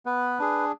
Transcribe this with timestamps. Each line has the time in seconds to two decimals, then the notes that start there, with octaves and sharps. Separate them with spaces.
0.06 B3 B4
0.39 D4 G#4